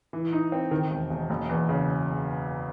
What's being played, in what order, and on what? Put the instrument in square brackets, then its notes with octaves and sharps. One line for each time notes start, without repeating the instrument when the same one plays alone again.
[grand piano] E3
D#4
C4
D#3
E1
E1
F#1
E2
C#3